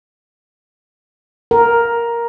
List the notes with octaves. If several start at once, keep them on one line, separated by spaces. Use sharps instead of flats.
A#4